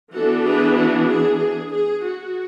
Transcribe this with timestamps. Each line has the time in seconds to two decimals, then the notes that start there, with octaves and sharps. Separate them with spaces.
0.15 E3 B3 D4 F#4 A4
0.47 G#4 B4
0.78 F#4
1.10 G#4
1.41 G#4
1.72 G#4
2.04 F#4